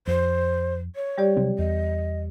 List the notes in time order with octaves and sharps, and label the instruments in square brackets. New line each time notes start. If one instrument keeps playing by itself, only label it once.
[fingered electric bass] F2 [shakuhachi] C5
[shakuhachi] C#5
[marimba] G3 G4 D5
[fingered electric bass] C3 F#3 C4
[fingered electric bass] E2 [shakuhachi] D#5